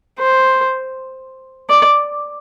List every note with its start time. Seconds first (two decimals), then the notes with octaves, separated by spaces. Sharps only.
0.19 C5
1.69 D5